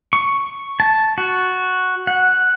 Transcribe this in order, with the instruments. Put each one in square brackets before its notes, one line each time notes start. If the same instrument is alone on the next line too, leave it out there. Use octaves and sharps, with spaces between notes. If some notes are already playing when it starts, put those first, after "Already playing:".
[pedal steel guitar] C#6
A5
F#4
F#5